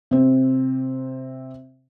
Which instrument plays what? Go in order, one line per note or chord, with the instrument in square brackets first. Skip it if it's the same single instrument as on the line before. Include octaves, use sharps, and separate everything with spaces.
[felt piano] C3 C4